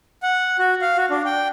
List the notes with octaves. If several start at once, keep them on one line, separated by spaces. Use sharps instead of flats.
F#5
F#4
F5
F#4
D4
G5